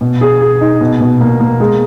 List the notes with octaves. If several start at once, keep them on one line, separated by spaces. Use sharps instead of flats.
B2
G#4
G#4
D#4
B2
B2
A#3
A#3
G#3